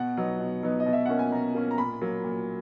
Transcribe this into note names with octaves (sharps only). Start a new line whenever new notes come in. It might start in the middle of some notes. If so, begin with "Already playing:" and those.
Already playing: B2 F#5
F#3 B3 D#4
B2
F#3 B3 D#4
D#5
B2
E5
A#3 C#4 F#5
G#5
B2 A#5
A#3 C#4
A#5
A#2 B5
F#3 A#3
A#2